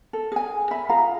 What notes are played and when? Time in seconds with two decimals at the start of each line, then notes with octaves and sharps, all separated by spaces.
0.13 A4
0.32 G#4 G#5
0.71 E5 B5
0.89 F4 G#4 F5 A#5